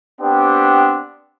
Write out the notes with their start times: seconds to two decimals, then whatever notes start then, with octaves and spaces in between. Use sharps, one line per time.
0.21 B3 C4 D4 G4